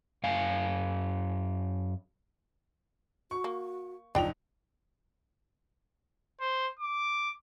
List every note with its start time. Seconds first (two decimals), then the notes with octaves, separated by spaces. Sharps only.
0.24 F#2 F5 G#5
3.31 F#4 C#6
3.44 A#3
4.15 F#1 F3 D4 D#4 G5 F7
6.40 C5
6.79 D6